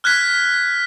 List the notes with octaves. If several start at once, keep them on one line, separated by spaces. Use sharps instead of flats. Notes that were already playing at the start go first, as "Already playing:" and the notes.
F6 F#6 G#6 B6